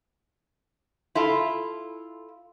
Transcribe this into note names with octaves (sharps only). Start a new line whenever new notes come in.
E4 F4 A4